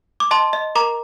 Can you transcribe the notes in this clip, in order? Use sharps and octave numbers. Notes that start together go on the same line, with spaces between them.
D6
D#5 A5 C6
D#5
A#4 A#5 D6